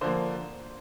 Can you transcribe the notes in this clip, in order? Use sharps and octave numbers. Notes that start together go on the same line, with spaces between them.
D3 F3 A#3 C5